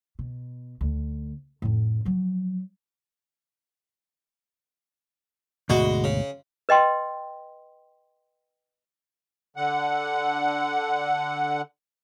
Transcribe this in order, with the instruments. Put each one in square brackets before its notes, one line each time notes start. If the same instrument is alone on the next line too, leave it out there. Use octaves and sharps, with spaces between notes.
[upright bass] B2
D2
F2 A2
F3 F#3
[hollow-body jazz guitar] D2 G#2 B2 [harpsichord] G#3 F#4
[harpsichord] C#3
[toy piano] B4 D#5 G5 C6
[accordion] D3 F#5